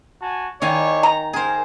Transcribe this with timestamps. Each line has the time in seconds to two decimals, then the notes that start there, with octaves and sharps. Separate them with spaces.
0.21 F#4 G#5 A5
0.62 D#3 E4 C#5 D5 F5 G#5
1.03 A#5
1.33 A#3 G#4 A#4 C5